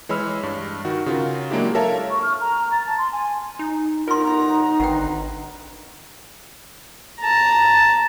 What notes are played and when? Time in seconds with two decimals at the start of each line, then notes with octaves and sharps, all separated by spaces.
0.09 E3 G#3 C#5 B5 E6 F6
0.43 G2
0.85 D#3 F#4
1.06 C#3 F4 F#4 A#4
1.51 F#3 G#3 A#3 D4 E4 G4
1.75 A4 A#4 C#5 E5 F5 A5
2.10 C#6
2.22 F6
2.40 A#5
2.72 A6
2.86 A5
2.98 C6
3.12 G#5
3.59 D#4
4.08 G1 D#4 F4 A#4 F#5 A#5 C6
4.80 G#1 D3 A#4 B4 F#5 G5
7.20 A5 A#5